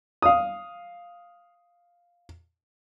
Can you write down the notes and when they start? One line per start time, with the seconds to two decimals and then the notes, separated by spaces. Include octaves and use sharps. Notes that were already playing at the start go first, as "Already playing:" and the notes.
0.22 F5 D#6